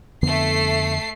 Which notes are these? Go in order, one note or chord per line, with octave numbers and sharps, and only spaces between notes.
F2 D3 A3 B3 C7